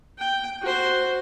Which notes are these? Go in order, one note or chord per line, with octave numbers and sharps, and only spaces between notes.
G5
F#4 C5